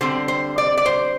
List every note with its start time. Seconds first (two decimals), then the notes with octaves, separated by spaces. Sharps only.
0.01 D3 G3 C4 C5
0.28 C5
0.58 D5
0.77 D5
0.86 C5